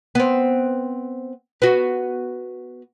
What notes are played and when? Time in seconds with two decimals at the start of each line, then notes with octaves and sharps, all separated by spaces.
0.15 B3 C4
1.62 B3 F#4